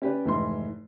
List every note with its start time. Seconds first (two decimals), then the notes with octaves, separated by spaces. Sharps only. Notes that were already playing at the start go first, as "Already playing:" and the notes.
0.02 C#4 G4 B4 D5
0.25 F1 G#2 E3 E4 C6